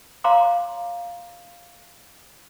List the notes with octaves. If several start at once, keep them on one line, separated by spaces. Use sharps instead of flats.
C#5 F5 A#5 C6 D6